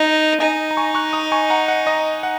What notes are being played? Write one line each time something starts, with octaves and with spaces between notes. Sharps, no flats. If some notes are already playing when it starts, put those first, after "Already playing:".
Already playing: D#4 D#5
D#4 D#5 G#5
A#5
G#5 C#6
C#6 F#6
A#5 D#6
G#5 C#6
F#5 A#5
F#5
D#5
F#5